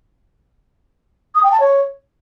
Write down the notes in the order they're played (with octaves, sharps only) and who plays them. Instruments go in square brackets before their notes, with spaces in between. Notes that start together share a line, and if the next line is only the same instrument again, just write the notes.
[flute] D#6
G5
A5
C#5